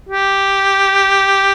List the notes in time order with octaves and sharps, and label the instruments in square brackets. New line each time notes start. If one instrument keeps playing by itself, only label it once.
[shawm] G4